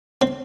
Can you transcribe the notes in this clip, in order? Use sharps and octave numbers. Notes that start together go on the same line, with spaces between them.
C4